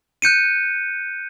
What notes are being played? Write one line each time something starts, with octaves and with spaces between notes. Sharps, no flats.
F#6 G6 C#7 D#7